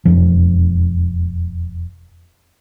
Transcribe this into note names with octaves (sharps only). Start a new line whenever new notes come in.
E1 F2 F3